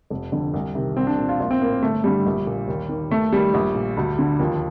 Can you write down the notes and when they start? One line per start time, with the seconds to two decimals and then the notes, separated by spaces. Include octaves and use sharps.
0.10 F1
0.32 F2 D3
0.54 C2
0.75 C3 D#3
0.97 C2 C4
1.07 D4
1.18 A#2
1.29 F4
1.40 A#1 F4
1.51 C4
1.61 A2 A#3
1.83 G1 A3
2.04 G2 D3 G3
2.26 A#1
2.47 A#2
2.68 D#2
2.89 D#3
3.11 D#2 A3
3.32 D#3 G3
3.54 A#1
3.75 A#2
3.97 D2
4.19 D3
4.39 D#2 F3